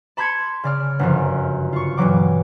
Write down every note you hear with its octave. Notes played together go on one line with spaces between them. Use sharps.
A5 B5 C6 G6 G#6 C#7
C#3 D5 F6
G1 F#2 F3
F4 C#6
G2 B2 E3 F#3 D6